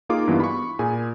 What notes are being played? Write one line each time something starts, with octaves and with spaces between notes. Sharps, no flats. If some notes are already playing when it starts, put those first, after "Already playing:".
A#3 D#4 F4 G#4 D6
G2 E3 B3
B5 C#6
A#2 G#4 G#5